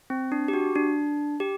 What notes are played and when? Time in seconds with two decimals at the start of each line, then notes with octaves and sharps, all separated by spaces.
0.10 C4
0.32 D4
0.48 G4
0.54 F#4
0.75 D4
1.40 G4